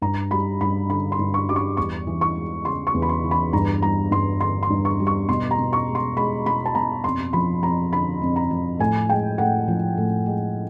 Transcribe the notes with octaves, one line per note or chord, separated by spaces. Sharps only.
G2 A#5
G3 B5
G2 B5
D3 B5
C6
G2
C#6
G3 D6
C#6
E2 C#6
E3
C#6
G#3
C#3 C6
C#6
E2
B5
C6
E3
B5
G2 A#5
G3 A#5
G2 C6
D3 C6
C6
G2
C#6
G3
C#6
B2 C6
A#5
B2
C#6
G#3
C6
G#3 B5
B2 B5
A5
B2 A#5
F2 C6
F3 B5
F2 A#5
D3 B5
F2
A#5
F3
A2 G#5
G#3 G5
A2 F#5
F3
A2
G#3